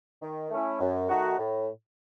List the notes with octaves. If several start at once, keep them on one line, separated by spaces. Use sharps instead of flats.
D#3
A3 C#4 E4
F#2
D#3 A3 D#4 F#4
A2